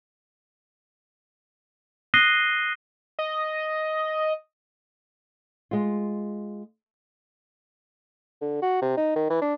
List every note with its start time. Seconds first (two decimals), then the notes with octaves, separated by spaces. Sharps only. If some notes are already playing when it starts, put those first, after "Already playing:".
2.14 D#6 F#6 A#6 C7 D#7 G7
3.19 D#5
5.71 G#3 F4
8.41 D3
8.62 F#4
8.82 C3
8.97 D#4
9.16 D#3
9.30 E3
9.41 D4